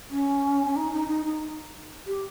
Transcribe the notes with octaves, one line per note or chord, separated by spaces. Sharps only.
C#4
C#4
D#4
D#4
D#4
D#4
G4